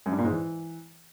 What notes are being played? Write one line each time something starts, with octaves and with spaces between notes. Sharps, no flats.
F#2
G2
A#2
G#2
E3